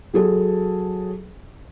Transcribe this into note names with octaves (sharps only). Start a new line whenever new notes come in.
F#3 G#4 A4